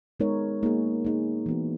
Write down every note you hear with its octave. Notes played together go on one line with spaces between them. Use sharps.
G#3 B3 D#4 A#4 C#5
A#3 D#4 G#4
A#3 D#4 G#4
E3 B3 F#4